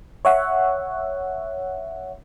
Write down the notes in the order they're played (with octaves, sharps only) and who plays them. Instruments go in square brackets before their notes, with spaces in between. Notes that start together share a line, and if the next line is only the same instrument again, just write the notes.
[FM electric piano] C#5 E5 F#5